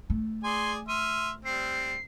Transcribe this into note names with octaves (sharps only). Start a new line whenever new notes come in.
A3
G#4 D5 G#5 C6
E5 C6 F6 D#7
G3 C4 C7